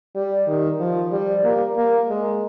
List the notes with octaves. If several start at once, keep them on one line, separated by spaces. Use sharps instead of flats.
G3
D#3
F3
G3
A#3
A#3
G#3